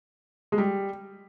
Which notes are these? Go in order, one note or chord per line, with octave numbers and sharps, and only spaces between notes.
G#3
G3